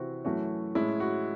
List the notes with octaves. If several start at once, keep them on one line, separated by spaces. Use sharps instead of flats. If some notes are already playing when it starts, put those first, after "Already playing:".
Already playing: C3 E3 C4 F#4
F#2 E3 A3 C#4 F#4
A2 G#3 C#4 E4
F#4